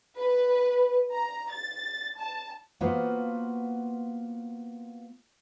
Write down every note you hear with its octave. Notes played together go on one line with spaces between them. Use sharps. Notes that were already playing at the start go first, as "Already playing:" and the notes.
B4
A#5
A6
A5
A#3 B3 F4 F#4 B4 C5